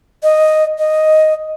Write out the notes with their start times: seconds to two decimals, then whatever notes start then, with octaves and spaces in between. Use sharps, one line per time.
0.23 D#5
0.78 D#5